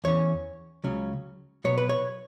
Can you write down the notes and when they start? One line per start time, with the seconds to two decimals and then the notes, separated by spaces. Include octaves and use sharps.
0.04 E2 E3 C#4 C#5
0.84 C#2 C#3 F#3 C#4
1.64 B2 F#3 B3 C#5
1.78 B4
1.89 C#5